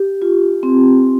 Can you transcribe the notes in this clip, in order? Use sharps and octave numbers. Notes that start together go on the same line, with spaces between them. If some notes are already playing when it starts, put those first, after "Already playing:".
Already playing: G4
F4
C4